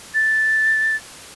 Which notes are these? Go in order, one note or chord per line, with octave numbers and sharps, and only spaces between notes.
A6